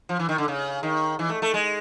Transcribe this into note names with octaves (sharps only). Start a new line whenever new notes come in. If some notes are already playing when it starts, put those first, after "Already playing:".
F3
E3
D#3
D3
C#3
D#3
E3
A3
A3
G#3